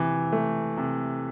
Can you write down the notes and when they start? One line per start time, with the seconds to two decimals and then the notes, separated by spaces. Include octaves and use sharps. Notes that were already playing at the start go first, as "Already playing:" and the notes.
Already playing: C3 E3
0.32 A3
0.77 C3